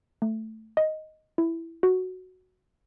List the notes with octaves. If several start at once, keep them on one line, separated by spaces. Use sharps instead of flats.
A3
D#5
E4
F#4